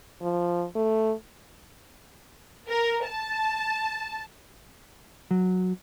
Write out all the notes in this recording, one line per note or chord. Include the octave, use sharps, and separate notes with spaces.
F3
A3
A#4
A5
F#3